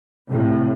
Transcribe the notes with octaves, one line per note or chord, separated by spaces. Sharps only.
A2 C3